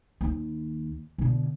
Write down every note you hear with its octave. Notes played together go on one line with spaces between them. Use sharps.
D#2
B2 D3